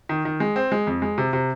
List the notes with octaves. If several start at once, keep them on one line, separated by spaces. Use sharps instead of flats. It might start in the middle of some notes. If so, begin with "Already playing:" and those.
D#3
D#3
G#3
C4
G#3
F2
G#3
C3
C3